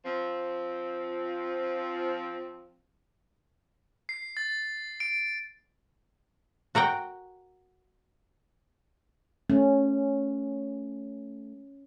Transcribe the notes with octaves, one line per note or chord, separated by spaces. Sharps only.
F3 C4
C7
A6
D7
F#4 A#4 F#5 G5
A3 C#4